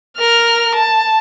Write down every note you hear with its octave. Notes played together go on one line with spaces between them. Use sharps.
A#4 F6
A5